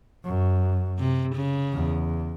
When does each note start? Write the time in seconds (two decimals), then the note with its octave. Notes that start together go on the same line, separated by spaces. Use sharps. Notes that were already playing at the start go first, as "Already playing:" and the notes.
0.24 F#2
0.99 C3
1.36 C#3
1.73 E2